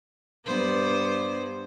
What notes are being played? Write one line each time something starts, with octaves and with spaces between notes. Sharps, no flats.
G2 B3 C5